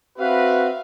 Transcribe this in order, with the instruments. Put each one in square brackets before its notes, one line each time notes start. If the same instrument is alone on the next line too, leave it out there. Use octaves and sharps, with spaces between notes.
[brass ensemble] C4 F#4 B4 [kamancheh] E5 F5